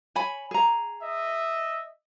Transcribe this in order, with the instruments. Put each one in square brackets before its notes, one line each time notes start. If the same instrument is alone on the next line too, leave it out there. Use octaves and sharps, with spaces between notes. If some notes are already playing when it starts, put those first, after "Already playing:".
[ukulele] C#5 G#5 B5
G#4 A#5
[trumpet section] D#5 E5